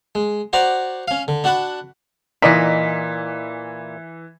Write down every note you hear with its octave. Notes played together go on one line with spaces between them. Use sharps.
G#3
F#4 C5 D5 F#5 A#5 D6
C#4 F5
D3
D4 F#4 F#5 A5 B5
A#2 E3 D#4 D5 D#5 B6